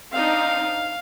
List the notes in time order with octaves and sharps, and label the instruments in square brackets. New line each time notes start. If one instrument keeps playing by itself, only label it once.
[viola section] C4 D4 D#4 [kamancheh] F5